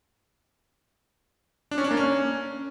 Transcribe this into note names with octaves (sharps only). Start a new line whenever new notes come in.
D4
C#4
D4
A#3
C#4